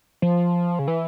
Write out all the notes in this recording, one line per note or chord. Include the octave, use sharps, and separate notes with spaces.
F3
C#3
E3